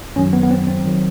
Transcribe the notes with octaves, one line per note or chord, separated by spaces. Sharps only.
F#2 D#3 F#3 C#4
B3
B3
C4
C4
D#3 F#3